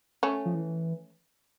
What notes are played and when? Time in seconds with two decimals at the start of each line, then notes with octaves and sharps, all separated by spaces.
0.23 A3 C#4
0.46 F3
0.55 E3